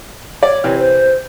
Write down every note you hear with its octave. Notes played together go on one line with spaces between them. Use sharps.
C#5 D5
C3 E3
C5